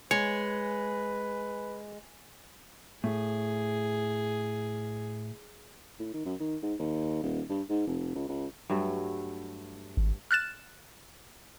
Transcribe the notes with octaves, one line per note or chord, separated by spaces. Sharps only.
G#3 B4 C#5
A2 G#4
A2
D#3
F#2
D#3
G#2
D#2
D#1
G2
G#2
F1
C#2
C#2
G2 F#3 A3
G#1
F6 F#6 A6 E7